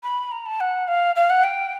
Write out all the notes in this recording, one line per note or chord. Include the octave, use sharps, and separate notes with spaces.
B5
A#5
A5
F#5
F5
F5
F#5
G5